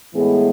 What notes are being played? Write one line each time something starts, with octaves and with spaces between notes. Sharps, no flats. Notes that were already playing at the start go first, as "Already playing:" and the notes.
A2 E3 G#3 B3 G#4